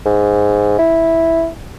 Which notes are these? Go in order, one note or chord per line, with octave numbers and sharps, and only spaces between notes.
G#2
E4